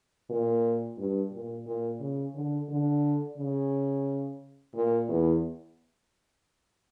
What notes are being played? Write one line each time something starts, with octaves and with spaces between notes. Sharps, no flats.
A#2
G2
A#2
A#2
C#3
D3
D3
C#3
A#2
E2